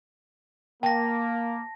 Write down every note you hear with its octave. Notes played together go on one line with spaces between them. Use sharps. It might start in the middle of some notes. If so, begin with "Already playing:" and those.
A#3 G5 A5 A#6